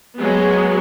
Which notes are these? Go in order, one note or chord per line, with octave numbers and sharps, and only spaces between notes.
F#3 G#3 B3 G#4